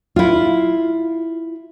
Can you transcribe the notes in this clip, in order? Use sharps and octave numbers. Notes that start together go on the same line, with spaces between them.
E4 F4